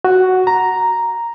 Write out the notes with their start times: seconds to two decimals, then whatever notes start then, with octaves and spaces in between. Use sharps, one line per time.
0.05 F#4
0.47 A#5